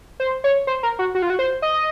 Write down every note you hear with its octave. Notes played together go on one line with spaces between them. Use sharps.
C5
C#5
C5
A#4
F#4
F#4
F4
F#4
C5
D#5